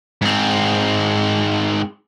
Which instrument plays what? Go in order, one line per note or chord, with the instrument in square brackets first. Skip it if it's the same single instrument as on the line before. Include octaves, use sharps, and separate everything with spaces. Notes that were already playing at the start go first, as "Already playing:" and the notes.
[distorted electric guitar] G#2 C4